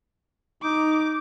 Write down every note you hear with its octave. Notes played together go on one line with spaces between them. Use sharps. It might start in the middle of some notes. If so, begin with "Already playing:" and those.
D#4 D6